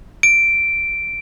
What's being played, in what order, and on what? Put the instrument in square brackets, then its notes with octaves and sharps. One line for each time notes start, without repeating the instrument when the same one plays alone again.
[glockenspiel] D7